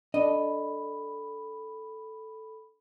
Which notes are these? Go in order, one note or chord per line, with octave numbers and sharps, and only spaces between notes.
D4 A4 D#5 B5